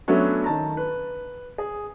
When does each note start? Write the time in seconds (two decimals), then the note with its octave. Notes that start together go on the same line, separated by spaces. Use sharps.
0.08 F#3 A3 B3 C#4 D4
0.44 D#3 A5 A#5
0.77 B4
1.58 G#4